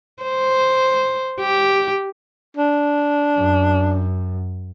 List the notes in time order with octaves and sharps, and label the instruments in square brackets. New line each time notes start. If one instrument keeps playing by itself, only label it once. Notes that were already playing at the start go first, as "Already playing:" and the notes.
[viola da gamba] C5
G4
[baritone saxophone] D4
[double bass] F#2